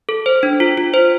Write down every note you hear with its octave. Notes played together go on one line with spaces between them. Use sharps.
A4
C5
D4
F4
F4
C5